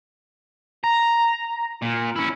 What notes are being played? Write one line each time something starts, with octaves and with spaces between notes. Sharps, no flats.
A#5
A#2
C#4 E4